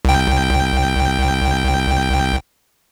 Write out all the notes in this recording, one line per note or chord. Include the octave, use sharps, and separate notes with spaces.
C2 G5